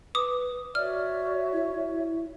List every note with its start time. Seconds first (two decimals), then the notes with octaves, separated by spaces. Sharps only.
0.15 B4 D6 D#6
0.75 F#4 C#5 D5 E5 F6
1.53 E4